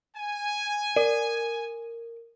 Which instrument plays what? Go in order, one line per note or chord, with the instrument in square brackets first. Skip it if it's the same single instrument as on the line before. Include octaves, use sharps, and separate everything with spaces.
[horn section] G#5
[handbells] A#4 [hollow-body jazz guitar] D5